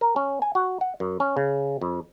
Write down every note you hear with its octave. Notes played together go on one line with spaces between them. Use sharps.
A#4
C#4
G#5
F#4
F#5
F#2
C#4
C#3
F2